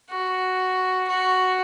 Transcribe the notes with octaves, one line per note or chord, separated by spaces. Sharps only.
F#4
F#4